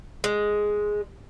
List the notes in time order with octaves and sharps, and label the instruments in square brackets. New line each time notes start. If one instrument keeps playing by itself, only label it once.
[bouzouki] G#3